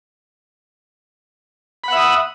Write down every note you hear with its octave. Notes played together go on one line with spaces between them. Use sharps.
E5 F#5 B5 D#6